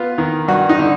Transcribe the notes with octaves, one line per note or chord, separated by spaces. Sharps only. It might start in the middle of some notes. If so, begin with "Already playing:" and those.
Already playing: B3 F4
D#3
G2 F#4
D#4
D3